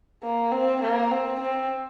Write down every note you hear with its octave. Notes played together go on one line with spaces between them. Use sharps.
A#3
C4
A#3
C4
C4